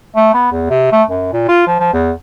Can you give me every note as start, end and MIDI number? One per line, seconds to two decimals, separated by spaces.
0.16 0.31 57
0.34 0.51 59
0.52 0.66 40
0.70 0.91 48
0.92 1.03 57
1.10 1.30 42
1.33 1.45 46
1.48 1.63 65
1.67 1.78 53
1.80 1.91 53
1.93 2.11 40